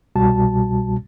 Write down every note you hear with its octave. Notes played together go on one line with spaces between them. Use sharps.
C2 B2 G3 F#4 A5